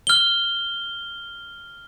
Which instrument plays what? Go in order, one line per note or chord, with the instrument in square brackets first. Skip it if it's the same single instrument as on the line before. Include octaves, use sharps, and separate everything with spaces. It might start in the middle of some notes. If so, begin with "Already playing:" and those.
[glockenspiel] F6 G7